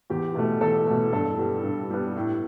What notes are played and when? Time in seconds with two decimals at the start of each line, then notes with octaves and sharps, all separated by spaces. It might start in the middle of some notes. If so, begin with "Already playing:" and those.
0.10 E2 G4
0.35 B2 A3
0.61 E2 A4
0.87 B2 A3
1.13 G2 A4
1.39 G3 B3
1.63 G2
1.90 G3 B3
2.16 A2